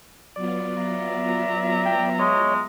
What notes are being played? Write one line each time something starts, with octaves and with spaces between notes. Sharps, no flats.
F#3 B3 F4 D5
E5 A#5
G5
G#3 C#5 D#5